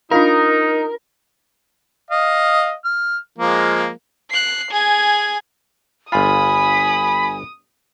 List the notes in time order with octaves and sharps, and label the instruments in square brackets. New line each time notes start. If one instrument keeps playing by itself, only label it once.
[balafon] D4 F4 F5 [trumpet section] D#4 [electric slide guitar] A#4
[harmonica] D#5 F5
F6
F3 G#3 A#3
[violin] F#6 C7
G#4 G#5
[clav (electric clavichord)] G1 F4 [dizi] G#5 [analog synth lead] B5 [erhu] D#6